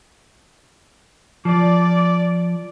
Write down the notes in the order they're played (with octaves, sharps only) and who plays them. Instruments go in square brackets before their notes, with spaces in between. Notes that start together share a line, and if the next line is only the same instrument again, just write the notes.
[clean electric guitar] F3 [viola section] D5